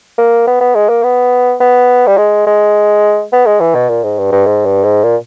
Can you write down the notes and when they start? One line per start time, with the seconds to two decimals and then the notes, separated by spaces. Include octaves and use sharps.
0.18 A#3
0.47 B3
0.61 B3
0.75 G#3
0.89 A#3
1.03 B3
1.60 B3
2.07 G3
2.17 G#3
2.46 G#3
3.33 B3
3.46 G#3
3.60 E3
3.74 B2
3.89 A#2
4.04 G#2
4.18 G2
4.32 G2
4.47 G#2
4.65 G2
4.84 G#2
5.03 A#2